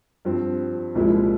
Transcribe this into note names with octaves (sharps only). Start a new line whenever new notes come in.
G2 F3 C4
C2 A#2 F3 G#3 E4